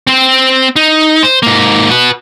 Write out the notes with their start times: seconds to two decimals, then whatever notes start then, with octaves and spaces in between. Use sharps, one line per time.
0.07 C4 C5
0.76 D#4
1.23 C5
1.43 G#2 A#3
1.90 F#4 B4